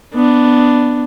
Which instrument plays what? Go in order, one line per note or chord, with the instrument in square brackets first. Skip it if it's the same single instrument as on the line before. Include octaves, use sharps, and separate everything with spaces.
[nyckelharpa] B3 D4